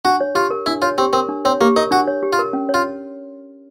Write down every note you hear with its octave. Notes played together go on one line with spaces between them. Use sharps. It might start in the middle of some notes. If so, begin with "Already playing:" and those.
D4 F#4
C#5
F4 G4
A#4
D4 E4
F4 C#5
C4 G4
C4 A#4
D4
C4 C#5
A#3 G4
D#4 A#4
D4 F#4
C#5
G4
F4
A#4
C#4
C#5
F4